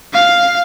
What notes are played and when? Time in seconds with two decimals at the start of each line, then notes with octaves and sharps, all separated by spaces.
0.13 F5